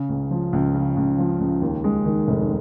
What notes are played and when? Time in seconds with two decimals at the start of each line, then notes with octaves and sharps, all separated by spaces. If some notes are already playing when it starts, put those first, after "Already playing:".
Already playing: C#3
0.09 C#2
0.31 F3
0.53 C#2
0.74 C#3
0.97 C#2
1.18 F3
1.40 C#2
1.62 D#2
1.84 G#3
2.06 D#3
2.27 F1